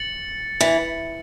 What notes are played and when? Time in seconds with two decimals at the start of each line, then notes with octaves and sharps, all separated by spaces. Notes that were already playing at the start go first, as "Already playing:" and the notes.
Already playing: A6 C#7 F#7
0.61 E3